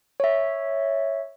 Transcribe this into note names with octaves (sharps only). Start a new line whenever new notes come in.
C#5 E5